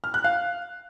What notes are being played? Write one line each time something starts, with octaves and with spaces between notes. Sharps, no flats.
F6
F#6
F5